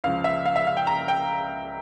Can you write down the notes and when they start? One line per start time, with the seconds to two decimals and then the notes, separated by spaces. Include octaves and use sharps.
0.04 C#2 C#3 F3 F5
0.24 E5
0.46 F5
0.56 E5
0.67 F5
0.77 G5
0.87 A#5
1.08 G5